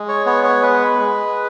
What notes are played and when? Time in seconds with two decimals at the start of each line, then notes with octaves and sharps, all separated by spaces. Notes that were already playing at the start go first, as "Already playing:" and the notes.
Already playing: G#3
0.09 C#5
0.26 B3 C#5
0.44 C#5
0.62 G#3 B4
0.99 G#3